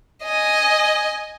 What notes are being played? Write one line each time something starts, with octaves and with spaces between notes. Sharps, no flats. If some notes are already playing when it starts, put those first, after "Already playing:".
D#5 G#5